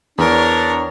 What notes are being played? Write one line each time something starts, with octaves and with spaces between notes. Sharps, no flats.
E2 D4 A#4 C#5